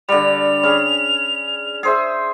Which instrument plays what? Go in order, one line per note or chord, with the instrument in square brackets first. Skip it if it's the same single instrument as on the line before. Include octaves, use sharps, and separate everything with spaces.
[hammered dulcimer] D3 G3 [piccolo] F7
[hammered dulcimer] C#4 G#4
G#4 C5 E5